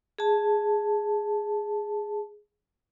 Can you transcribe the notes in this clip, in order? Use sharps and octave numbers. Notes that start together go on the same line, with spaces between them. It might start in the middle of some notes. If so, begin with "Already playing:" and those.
G#4 A5